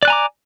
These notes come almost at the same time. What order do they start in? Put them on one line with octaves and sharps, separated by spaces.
D5 F#6 G#5 A#5 D6